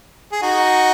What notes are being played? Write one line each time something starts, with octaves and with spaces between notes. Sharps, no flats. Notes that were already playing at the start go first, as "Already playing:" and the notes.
G#4
D#4 F#4